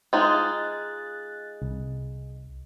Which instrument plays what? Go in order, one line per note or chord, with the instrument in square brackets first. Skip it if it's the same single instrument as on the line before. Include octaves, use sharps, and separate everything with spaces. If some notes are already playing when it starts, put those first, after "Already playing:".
[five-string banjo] G#3 D#4 F4 [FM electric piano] F#6 A6
[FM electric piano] C2